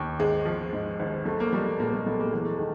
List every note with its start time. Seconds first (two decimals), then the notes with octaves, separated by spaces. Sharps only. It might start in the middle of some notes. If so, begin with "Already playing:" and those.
Already playing: D#2
0.19 G#1 G#3
0.45 F3
0.73 G#2
0.99 G#1
1.26 B1 A3
1.40 A#3
1.53 F3 G3 A3
1.80 A#2 G#3 A#3
1.92 G3 A3
2.06 B1 A3 B3
2.19 G#3 A#3
2.33 E2 G#3
2.45 A3
2.56 D#3 G#3